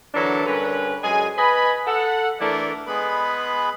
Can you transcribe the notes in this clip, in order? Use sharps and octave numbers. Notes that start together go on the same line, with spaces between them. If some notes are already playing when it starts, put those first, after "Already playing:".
D3 E3 F#3 D4 A4 A#4
G2 D3 C#4 A#4 B4
F#2 G#3 G#4 G#5
B4 D#5 G#5 B5
A4 F#5
E3 A3 D4 E4 A#4 D5
G#3 B3 G#4 B4 B5